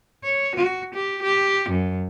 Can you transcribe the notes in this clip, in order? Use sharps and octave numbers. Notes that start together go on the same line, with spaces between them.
C#5
F#4
G4
G4
F#2